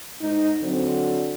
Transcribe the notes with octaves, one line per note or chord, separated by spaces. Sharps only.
G#2 D#4
D3 F#3 C4